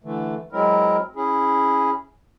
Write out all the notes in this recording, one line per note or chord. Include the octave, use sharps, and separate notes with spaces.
D3 E3 A3
F#3 G#3 C4 E4 A#4
C#4 E4 G#4